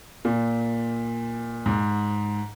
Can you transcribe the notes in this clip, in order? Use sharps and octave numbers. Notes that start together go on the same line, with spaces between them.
A#2
G#2